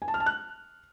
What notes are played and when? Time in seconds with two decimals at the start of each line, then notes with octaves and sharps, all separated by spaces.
0.02 G#5
0.08 A5
0.14 F6
0.20 A5
0.26 F#6